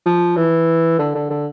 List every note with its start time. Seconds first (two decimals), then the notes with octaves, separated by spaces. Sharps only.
0.06 F3
0.36 E3
0.99 D3
1.15 D3
1.30 D3